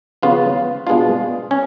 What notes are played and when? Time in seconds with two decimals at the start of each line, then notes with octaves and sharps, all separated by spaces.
0.22 C#3 F3 B3 F4
0.87 B2 G#3 B3 D4 F4
1.51 C#4